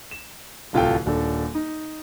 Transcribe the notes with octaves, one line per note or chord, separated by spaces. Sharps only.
E7
D1 C2 F4 A4 G5
D#1 D4 A4
D#4